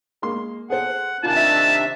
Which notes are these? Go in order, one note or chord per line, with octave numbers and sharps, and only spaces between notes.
G#3 A#3 C6
G#4 A4 C5 F#5
C3 D#3 D4 F4 G#5 A5 F#6
E5